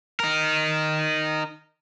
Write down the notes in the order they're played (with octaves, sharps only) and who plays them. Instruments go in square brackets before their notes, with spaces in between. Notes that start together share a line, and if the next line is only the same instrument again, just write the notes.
[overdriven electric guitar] D#4 A#4